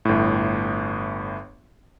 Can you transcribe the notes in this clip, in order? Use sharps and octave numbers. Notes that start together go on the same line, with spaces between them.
G1 A2